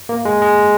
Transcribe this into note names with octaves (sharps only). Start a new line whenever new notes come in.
A#3
G#3
G#3